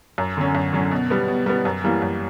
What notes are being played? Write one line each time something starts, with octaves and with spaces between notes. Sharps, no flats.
F#2
D3 F#3 C#4
F#2
D3 F#3 C#4
B2
G3 B3
B2
G3 B3
F#2
E3 G3 A#3
F#2